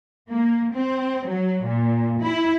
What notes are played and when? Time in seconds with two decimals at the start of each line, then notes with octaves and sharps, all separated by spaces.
0.29 A#3
0.72 C4
1.26 F#3
1.64 A#2
2.21 E4